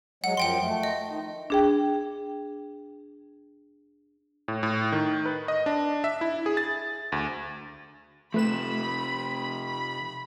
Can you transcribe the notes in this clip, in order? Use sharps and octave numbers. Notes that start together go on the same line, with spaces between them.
F#3 G#3 F#5
F#2 F3 F#5 G5 C6
A3
D#5
D#3
D4 G#4 G5
A2
A2
D#3
B4
D#5
D4
E5
E4
G#4
A6
D2
C3 F3 A3 B4 B5 E7
B5